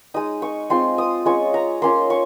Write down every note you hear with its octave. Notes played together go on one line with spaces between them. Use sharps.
G#3 D#4 D#6
C#6
G#3 C4 F4 C6
D#6
G#3 C#4 F4 C#6
A#5
A#3 C#4 F4 C6
C#6